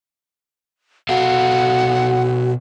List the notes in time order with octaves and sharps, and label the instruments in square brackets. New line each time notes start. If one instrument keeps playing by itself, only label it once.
[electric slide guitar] B2 A4 F5 [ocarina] F#4 [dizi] F#5